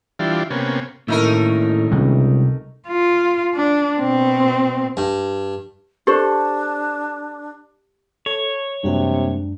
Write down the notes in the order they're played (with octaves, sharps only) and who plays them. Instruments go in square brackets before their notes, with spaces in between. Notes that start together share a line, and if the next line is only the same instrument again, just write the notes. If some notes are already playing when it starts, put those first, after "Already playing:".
[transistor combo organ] E3 G3 D4 F4
C3 A#3 B3 C#4
[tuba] A2 [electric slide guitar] D#3 A#3 C#4 [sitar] A3 D#4 A#4
[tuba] C#2 [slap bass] C3 G3 G#3
[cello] F4
D4
B2 C4
[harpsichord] G2
[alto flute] D4 [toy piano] G4 C#6 [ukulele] A4 C5
[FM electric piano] A4 [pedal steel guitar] C#5
[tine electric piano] F#2 G#3 D4 [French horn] C3 [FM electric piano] G3 A#3 F#4